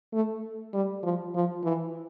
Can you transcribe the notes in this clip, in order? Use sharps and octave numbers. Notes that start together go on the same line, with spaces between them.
A3
G3
F3
F3
E3